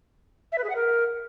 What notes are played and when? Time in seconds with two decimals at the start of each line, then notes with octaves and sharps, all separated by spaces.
0.52 E5
0.58 B4
0.64 G#4
0.70 F#5
0.75 A#4